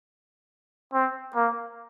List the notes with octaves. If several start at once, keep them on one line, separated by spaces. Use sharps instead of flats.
C4
A#3